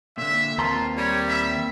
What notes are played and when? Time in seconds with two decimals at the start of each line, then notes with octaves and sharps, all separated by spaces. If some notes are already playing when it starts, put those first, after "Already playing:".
0.18 A#2 D3 E5
0.58 D#2 A#3 C4 F4 A5 A#5 C6
0.97 G3 C#5
1.28 E5